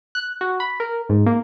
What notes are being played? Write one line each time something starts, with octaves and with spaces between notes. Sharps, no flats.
F#6
F#4
B5
A#4
G#2
A#3